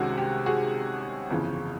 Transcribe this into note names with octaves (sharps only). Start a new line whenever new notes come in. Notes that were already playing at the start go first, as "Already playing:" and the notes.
Already playing: C2 C3 D#3 G#3 C#4 F#4
G4
F#4 G#4
G1 F2 C#3 E3